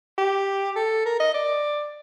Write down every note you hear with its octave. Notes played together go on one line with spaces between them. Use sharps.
G4
A4
A#4
D#5
D5